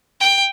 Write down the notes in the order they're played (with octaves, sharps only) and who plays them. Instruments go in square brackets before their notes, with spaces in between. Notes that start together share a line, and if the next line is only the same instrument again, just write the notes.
[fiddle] G5